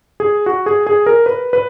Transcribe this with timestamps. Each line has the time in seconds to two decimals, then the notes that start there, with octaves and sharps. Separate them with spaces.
0.20 G#4
0.46 F#4
0.66 G#4
0.87 G#4
1.06 A#4
1.26 B4
1.53 B4